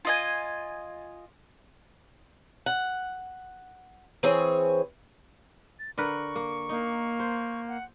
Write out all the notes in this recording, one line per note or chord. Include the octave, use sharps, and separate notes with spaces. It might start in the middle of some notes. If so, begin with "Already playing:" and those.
F4 D#5 G#5
F#5
E3 C4 G#4 C#5
A6
D3 A#4 B4 C#6
A#3
A#3 D#4
C5
F#5